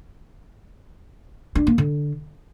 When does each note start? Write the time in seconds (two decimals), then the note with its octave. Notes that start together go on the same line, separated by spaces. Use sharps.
1.55 D4
1.67 A#3
1.78 D3